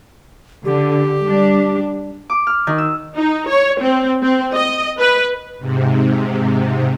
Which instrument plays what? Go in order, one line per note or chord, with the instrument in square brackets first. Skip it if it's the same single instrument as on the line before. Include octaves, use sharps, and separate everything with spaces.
[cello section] D3 [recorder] G4
[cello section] G3 D4
[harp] D6
F6
D#3
E6
[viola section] D#4
C#5
C4
C4
D#5
B4
[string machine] G#2 C3